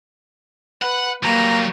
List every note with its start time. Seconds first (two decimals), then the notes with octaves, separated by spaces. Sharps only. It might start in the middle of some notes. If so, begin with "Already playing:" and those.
0.82 B4 F#5
1.23 F#3 G3 A#3 A#5